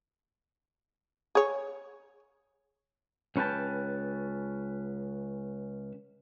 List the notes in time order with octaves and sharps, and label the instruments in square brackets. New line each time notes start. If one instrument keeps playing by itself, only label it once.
[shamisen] G#4 C#5
[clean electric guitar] C#2 C#4 B4 G5 A5